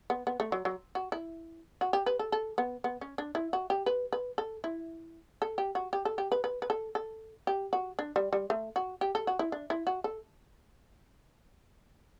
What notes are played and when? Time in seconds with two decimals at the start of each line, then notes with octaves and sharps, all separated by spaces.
0.10 B3
0.27 B3
0.40 A3
0.52 F#3
0.65 F#3
0.95 F#4
1.12 E4
1.81 F#4
1.93 G4
2.06 B4
2.19 A4
2.32 A4
2.58 B3
2.84 B3
3.01 C#4
3.18 D4
3.35 E4
3.53 F#4
3.70 G4
3.86 B4
4.13 B4
4.38 A4
4.64 E4
5.42 A4
5.58 G4
5.75 F#4
5.93 G4
6.05 A4
6.18 G4
6.32 B4
6.44 B4
6.62 B4
6.70 A4
6.95 A4
7.47 G4
7.73 F#4
7.99 D4
8.16 G3
8.33 G3
8.50 A3
8.76 F#4
9.01 G4
9.15 A4
9.27 F#4
9.39 E4
9.52 D4
9.70 E4
9.87 F#4
10.04 A4